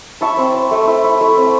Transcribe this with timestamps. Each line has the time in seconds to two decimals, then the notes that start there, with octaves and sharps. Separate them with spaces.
0.21 E4 A5 C#6
0.37 C4
0.54 C4
0.71 A3
0.87 E4
1.04 E4
1.21 A3
1.37 C4